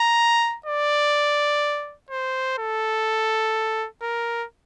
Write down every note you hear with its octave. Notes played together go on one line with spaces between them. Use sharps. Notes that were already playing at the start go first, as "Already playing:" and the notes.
Already playing: A#5
D5
C5
A4
A#4